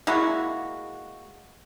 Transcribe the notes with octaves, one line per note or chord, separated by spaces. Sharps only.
G#3 A#3 E4 F#4